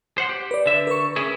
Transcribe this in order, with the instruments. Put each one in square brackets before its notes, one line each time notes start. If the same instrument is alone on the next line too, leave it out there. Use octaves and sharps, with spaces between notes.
[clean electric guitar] C5 F#5
G4
[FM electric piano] B4 D5
[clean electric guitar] D3 E5
[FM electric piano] A#4 B4 C#6
[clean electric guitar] C#4 E4 G#4